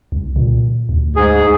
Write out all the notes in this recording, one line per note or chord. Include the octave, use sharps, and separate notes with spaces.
C2
A#2
D2
G#2 G#4